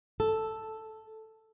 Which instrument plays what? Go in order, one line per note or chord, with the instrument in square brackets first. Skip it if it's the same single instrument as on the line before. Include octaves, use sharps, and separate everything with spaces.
[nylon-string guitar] A4